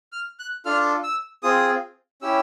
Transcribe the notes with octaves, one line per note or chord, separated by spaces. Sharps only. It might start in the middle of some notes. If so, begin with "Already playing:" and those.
F6
F#6
D4 F4 A4 F6
E6
C4 F4 G#4 D#6
C#4 E4 G4 E6